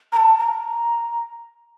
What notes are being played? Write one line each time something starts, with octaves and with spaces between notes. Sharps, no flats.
A#5
A5
A#5